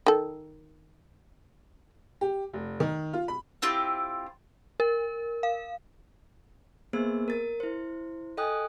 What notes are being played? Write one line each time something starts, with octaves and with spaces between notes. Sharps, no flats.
D#3 A4
G4
F1
D#3
F4
B5
C4 E4 F4 G4
A#4
F5
A#3 B3 G#4 C5 E6
A#4 A6
E4 C5
A4 D#5 G5 G#5 D#6 F#6